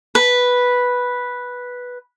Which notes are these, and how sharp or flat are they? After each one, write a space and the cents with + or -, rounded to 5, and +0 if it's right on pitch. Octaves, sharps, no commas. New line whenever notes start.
B4 -5